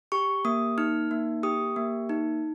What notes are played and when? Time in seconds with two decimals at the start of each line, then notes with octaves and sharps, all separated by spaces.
0.12 G4 C#6
0.45 A#3 D#6
0.78 D#4 F6
1.11 A#3
1.43 G4 D#6
1.76 A#3
2.09 D#4